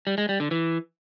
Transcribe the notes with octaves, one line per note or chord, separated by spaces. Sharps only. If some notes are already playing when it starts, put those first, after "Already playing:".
G3
G#3
G3
D3
E3